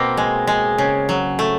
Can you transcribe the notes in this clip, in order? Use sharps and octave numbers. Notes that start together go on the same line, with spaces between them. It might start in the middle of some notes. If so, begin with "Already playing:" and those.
Already playing: B2 A#3 C4
G#3
G#3
C#3
F#3
A3